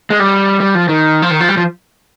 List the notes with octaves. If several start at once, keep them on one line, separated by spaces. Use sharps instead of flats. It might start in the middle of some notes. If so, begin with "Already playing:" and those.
G#3
G3
G3
F3
D#3
F3
D#3
F3
G3
F3